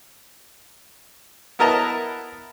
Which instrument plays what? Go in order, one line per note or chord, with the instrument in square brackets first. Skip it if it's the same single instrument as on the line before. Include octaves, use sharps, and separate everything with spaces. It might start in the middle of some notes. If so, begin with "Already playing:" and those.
[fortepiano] B3 E4 A#4 D#5 A5 A#5